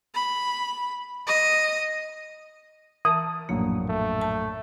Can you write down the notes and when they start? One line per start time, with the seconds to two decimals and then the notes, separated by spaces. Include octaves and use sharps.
0.14 B5
1.27 D#5
3.05 E3 A#4 A5 D#6
3.49 A#1 F#2 A2 A#3
3.89 A3
4.21 A5